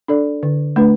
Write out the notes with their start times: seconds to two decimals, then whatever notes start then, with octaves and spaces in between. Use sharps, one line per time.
0.08 D4 A4 D5
0.43 D3
0.76 A3 D4 B4